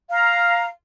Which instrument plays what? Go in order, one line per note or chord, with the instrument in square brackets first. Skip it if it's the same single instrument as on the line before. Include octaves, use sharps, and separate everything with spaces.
[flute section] F5 A#5